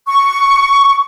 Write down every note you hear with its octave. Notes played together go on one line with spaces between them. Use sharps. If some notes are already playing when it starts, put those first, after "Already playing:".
C#6